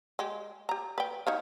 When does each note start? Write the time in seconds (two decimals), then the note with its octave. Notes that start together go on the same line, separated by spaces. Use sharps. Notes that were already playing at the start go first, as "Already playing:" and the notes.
0.19 G#3 G4
0.69 G4 A#5
0.98 B4 G5
1.27 D#4 C#5 F5